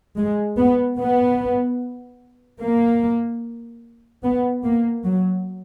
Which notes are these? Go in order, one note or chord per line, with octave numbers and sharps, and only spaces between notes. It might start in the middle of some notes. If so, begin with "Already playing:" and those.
G#3
B3
B3
A#3
B3
A#3
F#3